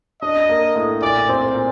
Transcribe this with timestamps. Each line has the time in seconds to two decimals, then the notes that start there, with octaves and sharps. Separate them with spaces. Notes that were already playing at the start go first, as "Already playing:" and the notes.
0.22 D4 D#5
0.49 A#3
0.76 A2
1.02 A#2 D5
1.29 C4
1.55 A#2